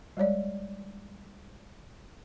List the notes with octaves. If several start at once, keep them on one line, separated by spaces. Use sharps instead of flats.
G3 G#3 C#5 D5